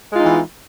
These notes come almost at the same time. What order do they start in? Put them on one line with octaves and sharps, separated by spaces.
G#3 F4 D#4 B3 E3